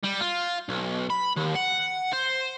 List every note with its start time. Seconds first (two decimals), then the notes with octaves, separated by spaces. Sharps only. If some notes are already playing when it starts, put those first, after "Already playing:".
0.03 G3
0.20 F4
0.69 B1
1.10 B5
1.37 D#2
1.56 F#5
2.12 C5